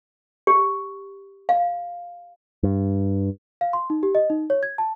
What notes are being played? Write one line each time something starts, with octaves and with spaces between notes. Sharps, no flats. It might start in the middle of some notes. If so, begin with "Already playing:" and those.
G4
F5
G2
F5
C6
D#4
G4
D#5
D#4
C#5
G#6
A5